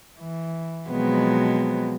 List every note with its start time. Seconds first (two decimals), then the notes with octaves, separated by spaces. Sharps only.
0.17 E3
0.89 B2 F3 F#3 G#3 B3 C4